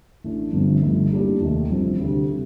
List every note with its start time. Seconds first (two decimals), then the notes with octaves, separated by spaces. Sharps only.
0.24 A1 A2 A3 D4
0.53 G1 G2 D3 F3 C4
0.82 G1 G2 F3 A3 D#4
1.11 A2 G3 A#3 D4 G4
1.40 F1 D#2 D#3 A3
1.70 A1 G2 F3 C4
2.00 D2 C3 G3
2.28 C3 G3